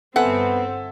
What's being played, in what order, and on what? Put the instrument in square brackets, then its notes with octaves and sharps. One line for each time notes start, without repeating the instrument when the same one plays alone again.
[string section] G1 C4 [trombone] B3 [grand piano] A4 E5 G#5 [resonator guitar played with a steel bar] F#5